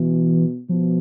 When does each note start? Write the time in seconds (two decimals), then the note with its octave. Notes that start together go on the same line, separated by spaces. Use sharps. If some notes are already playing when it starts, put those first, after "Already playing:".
Already playing: B2 E3
0.69 B2 F3